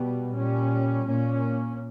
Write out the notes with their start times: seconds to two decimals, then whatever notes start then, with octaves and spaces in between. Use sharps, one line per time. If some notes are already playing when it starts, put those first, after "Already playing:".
Already playing: B2 G3 B3
0.34 A#2 G3 C#4
1.05 A#2 A#3 C#4